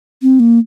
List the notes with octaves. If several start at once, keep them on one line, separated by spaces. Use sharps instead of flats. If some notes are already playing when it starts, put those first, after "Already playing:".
C4
A#3